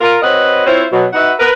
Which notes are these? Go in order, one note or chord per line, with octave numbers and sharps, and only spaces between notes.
F4 A#4
C4 F#4 B4 C#5 D#5
C4 E4 F4 C5 C#5
B2 F#3
D#4 F#4 B4 E5 F#5
A#4 B4